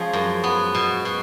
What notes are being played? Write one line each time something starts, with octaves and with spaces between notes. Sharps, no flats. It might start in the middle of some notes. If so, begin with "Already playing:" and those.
Already playing: F3 G#3 C#4 G#4
F#2
B3
B2
B2